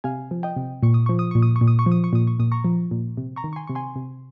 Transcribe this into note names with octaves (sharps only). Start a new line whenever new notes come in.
C3 F5 G#5
F3
D#5 G5
C3
A#2 C#6
D#6
F3 C#6
D#6
A#2 C#6
D#6
C#6
A#2
D#6
C#6
F3
D#6
C#6
A#2 D#6
C#6
A#2 D#6
A#5 C#6
F3
A#2
C3
A#5 C#6
D#3
C#6
G#5 C6
C3 C#6
G#5 C6
C3